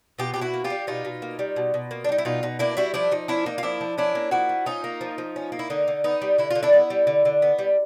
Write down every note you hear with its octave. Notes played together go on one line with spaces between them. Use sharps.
B2 F4 G4
B2 G4
E4 F#4
A#3
F4 G4
G3
B2 D#4 F4
B2
A#3
G3
B2
B2
A#3
D4
G3 D#4
E4
B2 D#4 F4
B2 D#4
A#3 D4 E4
G3 E4 F#4
F3 D4 E4
F3 D#4
C#4 D4 E4
A#3 D#4
F4
F3 D4 E4
F3
C#4 D4 E4
A#3
F3 E4 F#4
F3
C#4 D#4 F4
A#3
F3
F3
C#4
A#3
E4
D3 D#4
D3
B3 D#4
G3
D3 E4
D3 F4
D4 E4
B3
G3
D3
D3
B3
G3